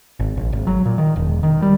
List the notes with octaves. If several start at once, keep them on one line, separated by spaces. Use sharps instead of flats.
G#1
A#1
G#1
F#3
A#2
D#3
E1
D#3
G3